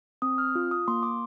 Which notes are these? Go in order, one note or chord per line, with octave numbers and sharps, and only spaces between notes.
C4 D#6
F6
F4
D#6
A#3 C6
D6